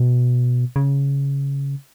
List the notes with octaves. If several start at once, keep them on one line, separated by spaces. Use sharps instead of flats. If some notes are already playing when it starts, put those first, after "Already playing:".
Already playing: B2
C#3